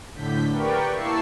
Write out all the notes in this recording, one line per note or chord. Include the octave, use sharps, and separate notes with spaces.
A2 D3 G6 B6
G4 A#4 B4 D5 G5 C#6
A#3 E4 A5 C#6 E6 C7